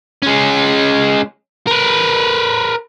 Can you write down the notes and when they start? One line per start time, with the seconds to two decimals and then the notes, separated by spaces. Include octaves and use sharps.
0.23 G#3 C#4
1.68 A#4 B4